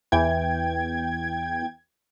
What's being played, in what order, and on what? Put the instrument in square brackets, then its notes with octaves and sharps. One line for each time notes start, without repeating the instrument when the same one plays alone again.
[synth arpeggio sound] E2 G5 G#6 [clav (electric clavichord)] E3